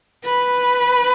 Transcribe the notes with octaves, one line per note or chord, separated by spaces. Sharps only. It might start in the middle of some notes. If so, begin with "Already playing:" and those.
B4